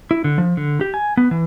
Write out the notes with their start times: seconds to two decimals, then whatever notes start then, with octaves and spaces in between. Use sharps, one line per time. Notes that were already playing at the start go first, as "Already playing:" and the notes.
0.11 E4
0.24 D3
0.38 F3
0.57 D3
0.81 G4
0.94 G#5
1.17 B3
1.31 E3